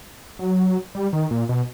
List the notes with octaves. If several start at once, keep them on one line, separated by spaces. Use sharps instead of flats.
F#3
G3
D#3
A#2
B2